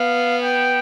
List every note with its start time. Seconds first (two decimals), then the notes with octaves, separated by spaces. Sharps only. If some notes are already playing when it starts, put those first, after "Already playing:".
Already playing: B3 F5
0.43 G5